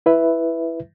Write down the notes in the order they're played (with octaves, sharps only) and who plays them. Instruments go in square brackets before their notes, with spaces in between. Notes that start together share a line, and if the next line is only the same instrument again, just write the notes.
[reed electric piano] E4 B4 E5